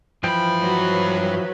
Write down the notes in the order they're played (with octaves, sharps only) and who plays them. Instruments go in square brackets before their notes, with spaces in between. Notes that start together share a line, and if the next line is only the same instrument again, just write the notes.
[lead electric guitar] G2 B5 [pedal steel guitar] E3 F3 G5
[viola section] F#3 B4